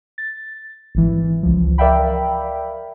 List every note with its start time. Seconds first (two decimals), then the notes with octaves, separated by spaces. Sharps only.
0.18 A6
0.95 G#1 E3
1.43 C#2 F3
1.78 A#4 D5 E5 F5 G5 B5